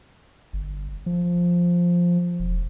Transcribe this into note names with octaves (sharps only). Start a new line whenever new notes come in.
G1
F3
E1